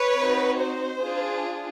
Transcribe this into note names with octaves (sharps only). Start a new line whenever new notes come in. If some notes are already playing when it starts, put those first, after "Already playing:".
Already playing: B4 C#5
C4 D#4 F#4
C5
D4 F4 G#4